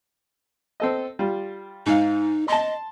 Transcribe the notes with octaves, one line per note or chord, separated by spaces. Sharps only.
C4 A4 D#5
G3 F4
G#2 D#4 F5
D#5 A5 C6